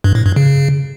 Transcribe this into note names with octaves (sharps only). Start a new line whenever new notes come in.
G2
A2
G2
C#3